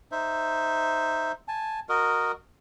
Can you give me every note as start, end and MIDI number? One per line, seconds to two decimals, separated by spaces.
0.12 1.32 63
0.12 1.32 72
0.12 1.32 76
1.48 1.80 80
1.48 1.80 81
1.89 2.32 66
1.89 2.32 70
1.89 2.32 75